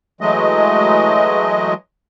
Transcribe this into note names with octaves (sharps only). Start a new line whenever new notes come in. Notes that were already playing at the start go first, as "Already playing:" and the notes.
E3 F#3 G#3 A3 D#5